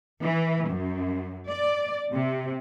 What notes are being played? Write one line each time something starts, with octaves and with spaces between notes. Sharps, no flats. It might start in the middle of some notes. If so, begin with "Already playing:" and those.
E3
F#2
D5
C3